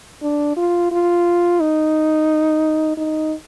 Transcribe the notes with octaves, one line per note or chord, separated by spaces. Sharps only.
D4
F4
F4
D#4
D#4